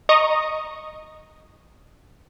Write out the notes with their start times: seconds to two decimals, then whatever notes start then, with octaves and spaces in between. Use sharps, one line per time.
0.09 D#5 A#5 C#6 D#6